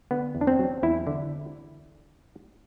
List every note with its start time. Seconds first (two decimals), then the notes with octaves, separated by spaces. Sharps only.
0.11 D3 B3
0.35 E2
0.41 D4
0.47 C4
0.59 F#3
0.83 E2 E4
1.07 D3